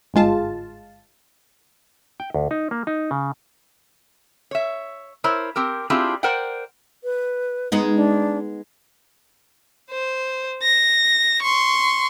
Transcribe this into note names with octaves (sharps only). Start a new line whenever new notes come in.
G1 G#2 G#3 F4 A5
G5
D2
D#4
A#3
D#4
C#3
C#5 E5
E4 A#4 C5 C#5
C4 G4 A#4
C4 D4 E4 F4 G4 G#4
A#4 C5 D5 F#5 G5
B4
G#3 B3 D#4
D4
C5
A#6
C6 C#6